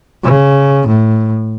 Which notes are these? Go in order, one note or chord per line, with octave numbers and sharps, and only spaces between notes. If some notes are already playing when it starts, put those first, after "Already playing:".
C#3
A2